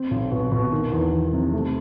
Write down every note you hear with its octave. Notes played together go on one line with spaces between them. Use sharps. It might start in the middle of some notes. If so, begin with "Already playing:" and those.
Already playing: C4
B1
B2
B2
D#3
E2
D#3
C3
A3